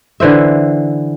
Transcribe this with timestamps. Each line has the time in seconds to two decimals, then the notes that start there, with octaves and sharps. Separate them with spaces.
0.20 D3 E3 C5 E5